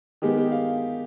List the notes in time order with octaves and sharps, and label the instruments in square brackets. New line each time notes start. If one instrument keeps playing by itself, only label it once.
[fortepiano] D#3 G#3 B3 G4
G4
F5